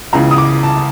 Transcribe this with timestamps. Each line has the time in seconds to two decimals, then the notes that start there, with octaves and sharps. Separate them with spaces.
0.13 C#2 C#3 E3 A#5
0.31 D#6
0.38 D6
0.63 A5